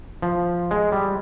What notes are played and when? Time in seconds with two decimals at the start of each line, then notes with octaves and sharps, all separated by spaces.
0.22 F3
0.71 G#3
0.92 G3